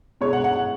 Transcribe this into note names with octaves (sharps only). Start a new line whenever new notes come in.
B2 G#3 C#5
F#5
F#5
F#5